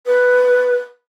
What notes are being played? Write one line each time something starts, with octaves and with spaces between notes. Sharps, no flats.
B4